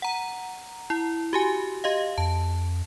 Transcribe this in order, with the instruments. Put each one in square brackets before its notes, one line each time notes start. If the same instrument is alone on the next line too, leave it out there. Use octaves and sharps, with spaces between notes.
[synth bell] F#5 A#5
E4
F#4 G4 G#5
G4 D#5 F5
[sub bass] F2 [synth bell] A5